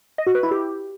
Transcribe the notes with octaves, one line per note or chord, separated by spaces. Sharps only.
D#5
F#4
B4
E4
G4